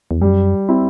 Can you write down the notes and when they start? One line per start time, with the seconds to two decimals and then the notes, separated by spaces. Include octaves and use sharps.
0.11 E2
0.21 F#2 G3
0.69 C4 E4